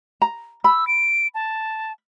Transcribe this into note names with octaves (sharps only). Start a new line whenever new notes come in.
A#5
B5 E6
D7
A5